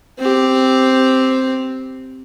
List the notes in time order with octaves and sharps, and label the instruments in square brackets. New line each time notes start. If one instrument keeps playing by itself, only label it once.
[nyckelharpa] C4 G4